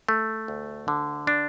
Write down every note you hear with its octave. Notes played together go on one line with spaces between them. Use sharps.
A3
D2
D3
D4